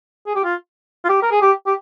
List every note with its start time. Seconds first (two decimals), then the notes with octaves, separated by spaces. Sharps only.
0.26 G#4
0.35 G4
0.44 F4
1.04 F4
1.09 G4
1.22 A#4
1.31 G#4
1.42 G4
1.67 G4